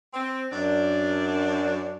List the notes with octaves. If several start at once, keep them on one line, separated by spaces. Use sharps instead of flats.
C4
F#2 D4